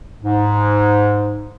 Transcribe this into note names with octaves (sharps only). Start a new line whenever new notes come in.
G#2